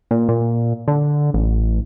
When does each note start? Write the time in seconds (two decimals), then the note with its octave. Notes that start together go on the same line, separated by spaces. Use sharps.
0.11 A#2
0.29 A#2
0.88 D3
1.34 A1